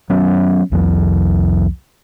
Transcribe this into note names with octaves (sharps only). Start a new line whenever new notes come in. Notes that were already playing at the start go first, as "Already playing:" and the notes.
F#3 B3 C#4
C2 F2 F3